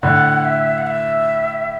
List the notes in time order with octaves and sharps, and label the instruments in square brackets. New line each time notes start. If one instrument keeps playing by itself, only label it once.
[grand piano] A2 D3 [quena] F#5
[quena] E5
F#5
E5